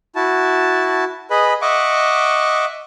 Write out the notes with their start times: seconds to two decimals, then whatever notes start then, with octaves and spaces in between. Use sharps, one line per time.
0.16 E4 F#4 A5
1.30 G#4 B4 D#5 B5
1.62 D#5 E5 F#5 C#6 D6